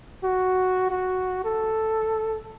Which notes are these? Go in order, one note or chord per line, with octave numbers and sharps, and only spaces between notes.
F#4
F#4
A4